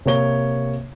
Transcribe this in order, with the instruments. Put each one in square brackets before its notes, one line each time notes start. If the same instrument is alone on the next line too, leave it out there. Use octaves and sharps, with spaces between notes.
[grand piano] C3 A#3 C#5 G7